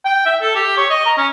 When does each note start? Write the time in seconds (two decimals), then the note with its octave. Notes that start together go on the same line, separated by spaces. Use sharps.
0.05 G5
0.26 E5
0.41 A4
0.55 G4
0.77 C#5
0.90 D#5
1.05 A#5
1.17 C#4